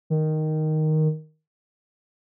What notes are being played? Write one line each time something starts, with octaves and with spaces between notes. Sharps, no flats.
D#3